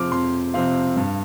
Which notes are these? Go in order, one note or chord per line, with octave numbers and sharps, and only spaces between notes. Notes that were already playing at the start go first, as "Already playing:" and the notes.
Already playing: F2 C3 F3 C4 D6 F6
F2 C6
C3 F3 C4 F5
G2